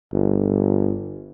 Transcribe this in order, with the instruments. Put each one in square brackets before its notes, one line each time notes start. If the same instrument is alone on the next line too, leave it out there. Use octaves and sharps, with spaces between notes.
[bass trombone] G1